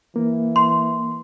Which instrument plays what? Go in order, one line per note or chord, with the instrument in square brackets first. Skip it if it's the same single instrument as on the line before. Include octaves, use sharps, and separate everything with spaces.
[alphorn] E3 [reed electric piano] A#3
[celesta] C6